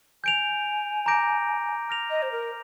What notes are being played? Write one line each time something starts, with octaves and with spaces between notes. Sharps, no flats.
G#5 G6 D7 F7
A#5 D6 G6 A#6 D7
F6 A#6 F7
D#5
C5
A#4